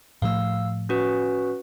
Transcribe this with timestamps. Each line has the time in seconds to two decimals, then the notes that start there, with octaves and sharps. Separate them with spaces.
0.22 A2 F3 A3 F5 E6
0.89 C#4 F#4 B4